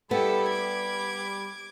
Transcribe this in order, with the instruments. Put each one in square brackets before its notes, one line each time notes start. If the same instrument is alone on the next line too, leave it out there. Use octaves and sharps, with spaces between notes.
[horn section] G3 B5 [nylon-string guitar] B3 [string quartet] E4 G4 A4
[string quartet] D6 G#6